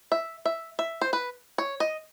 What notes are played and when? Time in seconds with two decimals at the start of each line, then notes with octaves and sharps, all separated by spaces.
0.12 E5
0.45 E5
0.79 E5
1.01 C5
1.13 B4
1.58 C#5
1.80 D#5